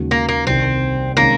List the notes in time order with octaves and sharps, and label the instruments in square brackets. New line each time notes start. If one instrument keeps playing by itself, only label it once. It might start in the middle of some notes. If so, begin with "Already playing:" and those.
Already playing: [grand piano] D#2 C#3 G#3 D#4 F#4
[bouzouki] A#3
A#3
[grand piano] C2 C3 D#3 [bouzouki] C4
[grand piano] C3 D#3 G#3 C#4 [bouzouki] A#3